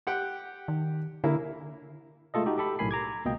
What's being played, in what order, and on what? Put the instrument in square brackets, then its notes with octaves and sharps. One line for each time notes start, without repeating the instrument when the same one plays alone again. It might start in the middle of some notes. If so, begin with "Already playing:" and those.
[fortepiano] G4 F#5 G5
[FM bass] D#3
[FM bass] D3 [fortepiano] A#3 E4
[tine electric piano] G#3 A3 F4 A4 D#5
D#4 F#4 G4
G4 A4 B5
B1 A2 A#4 G#5 B5 C7
A#5 D6 G#6
C#2 B2 A#3 D#5 G5